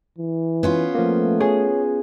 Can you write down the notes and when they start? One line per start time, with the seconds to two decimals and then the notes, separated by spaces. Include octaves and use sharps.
0.18 E3
0.63 B3 C#4 F4
0.95 F3 A3 A#3
1.40 G#4 C#5